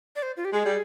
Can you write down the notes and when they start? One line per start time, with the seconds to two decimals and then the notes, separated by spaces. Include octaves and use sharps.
0.16 D5
0.22 C5
0.37 F4
0.45 G4
0.53 G#3 G#4
0.65 G3